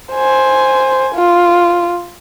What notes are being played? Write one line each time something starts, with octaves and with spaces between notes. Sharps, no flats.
C5 G#5
F4